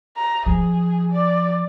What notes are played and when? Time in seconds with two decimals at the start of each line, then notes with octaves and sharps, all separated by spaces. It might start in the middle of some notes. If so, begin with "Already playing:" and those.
0.17 A#5
0.46 F3 G#4
1.12 D5